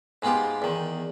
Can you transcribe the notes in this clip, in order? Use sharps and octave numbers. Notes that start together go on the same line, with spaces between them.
G#2 G#3 B3 F4 G4
E2 D#3